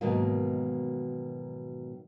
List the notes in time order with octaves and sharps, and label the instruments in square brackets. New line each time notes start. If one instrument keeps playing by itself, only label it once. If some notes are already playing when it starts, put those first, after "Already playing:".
[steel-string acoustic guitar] G#2 B2 D#3 E3 F#3 A#3